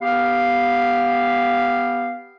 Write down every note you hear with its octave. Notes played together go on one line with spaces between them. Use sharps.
B3 G4 F5